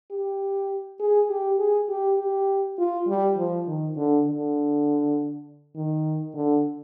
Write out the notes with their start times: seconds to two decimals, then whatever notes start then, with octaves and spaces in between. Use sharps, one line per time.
0.10 G4
1.00 G#4
1.30 G4
1.59 G#4
1.89 G4
2.18 G4
2.79 F4
3.08 G3
3.38 F3
3.67 D#3
3.97 D3
4.27 D3
5.75 D#3
6.35 D3